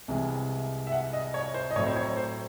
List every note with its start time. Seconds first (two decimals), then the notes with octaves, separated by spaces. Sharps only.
0.08 C2 C3 E3 G#3
0.87 E5
0.92 F#5
1.13 D#5
1.34 C#5
1.54 C5
1.71 D#5
1.76 A2 F#3 C4 C#5
1.86 C5
1.96 C#5
2.17 C5